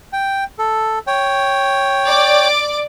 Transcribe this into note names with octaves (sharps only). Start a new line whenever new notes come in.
G5
A4
C#5 G5
D5 D6